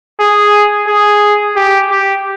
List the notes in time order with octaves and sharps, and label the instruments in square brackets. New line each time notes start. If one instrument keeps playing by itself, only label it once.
[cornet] G#4
G#4
G4
G4